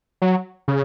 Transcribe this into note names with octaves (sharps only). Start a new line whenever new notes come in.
F#3
C#3